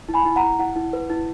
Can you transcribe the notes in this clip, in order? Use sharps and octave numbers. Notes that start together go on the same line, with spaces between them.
E4
G#5 B5
E4
F#5 A#5
E4
E4 F#5
E4
B4
E4